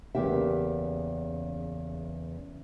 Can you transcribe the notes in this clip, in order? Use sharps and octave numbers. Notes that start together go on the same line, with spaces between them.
E2 C#3 A#3 G4 E5